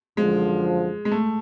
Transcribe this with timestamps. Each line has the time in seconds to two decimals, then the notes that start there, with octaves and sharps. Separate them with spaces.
0.17 F#2 D3 F3 G#3
1.05 G#3
1.12 A3